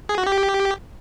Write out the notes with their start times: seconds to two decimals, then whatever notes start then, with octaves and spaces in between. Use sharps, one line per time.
0.09 G#4
0.18 F#4
0.27 G4